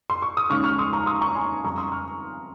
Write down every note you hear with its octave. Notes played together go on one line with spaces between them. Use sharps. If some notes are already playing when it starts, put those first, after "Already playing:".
C6
C#6
D#6
D#2 C#3 G#3 C#4 C#6 F6
C#6 F6
C6 D#6
A#5 C#6
C6 D#6
A#5 C#6
G#5 C6
F2 C#3 G3 A#5 C#6
C6 D#6
C#6 F6